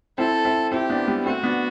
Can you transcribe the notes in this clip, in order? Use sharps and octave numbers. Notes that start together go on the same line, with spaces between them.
C4 E4 A4
C4 E4
C4 E4 G4
B3 D4
G3 B3
A3 C4 F#4
B3 D4